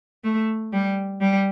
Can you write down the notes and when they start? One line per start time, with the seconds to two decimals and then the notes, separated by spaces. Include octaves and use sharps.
0.24 A3
0.73 G3
1.21 G3